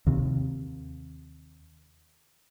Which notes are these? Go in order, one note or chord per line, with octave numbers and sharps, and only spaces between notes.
D#2 C3